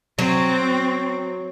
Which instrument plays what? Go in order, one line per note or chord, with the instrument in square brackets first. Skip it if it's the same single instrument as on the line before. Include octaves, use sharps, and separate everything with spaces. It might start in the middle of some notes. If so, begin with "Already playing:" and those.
[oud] F#3 [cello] C4